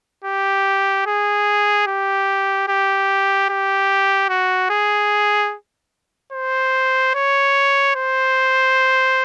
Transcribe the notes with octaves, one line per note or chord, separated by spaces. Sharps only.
G4
G#4
G4
G4
G4
F#4
G#4
C5
C#5
C5